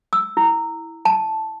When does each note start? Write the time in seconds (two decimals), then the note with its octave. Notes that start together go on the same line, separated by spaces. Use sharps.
0.13 E6
0.37 E4
1.05 A5